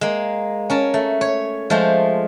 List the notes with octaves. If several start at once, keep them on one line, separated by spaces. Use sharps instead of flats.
G#3 A#3
C#4 A#4 A5
A3
C#5
F3 G#3 A3 F4 C5